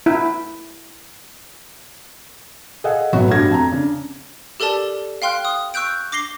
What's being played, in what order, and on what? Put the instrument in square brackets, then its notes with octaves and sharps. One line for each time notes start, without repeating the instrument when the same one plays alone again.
[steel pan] E4
[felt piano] G#4 A4 D#5 F5 F#5
A1 F#3 B3 F#4 C#5 E5
G2 B2 A3 F#4 G#6 A#6
F2 A5 A#5
C#3 D4
[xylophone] G4 A4 A#4 D5 A5
F5 G5 C6 F6 F#6
D#6
C#6 E6 F#6 G6 D7
D6 A#6 C7 G7